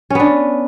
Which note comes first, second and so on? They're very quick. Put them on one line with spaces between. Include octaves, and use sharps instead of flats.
C#4 B3 D4